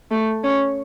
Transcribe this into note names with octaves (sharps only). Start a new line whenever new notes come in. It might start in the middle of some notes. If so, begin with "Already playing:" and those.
A3
C#4